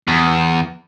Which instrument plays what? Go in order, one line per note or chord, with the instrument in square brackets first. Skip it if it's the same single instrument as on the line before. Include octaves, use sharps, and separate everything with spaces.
[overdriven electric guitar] E2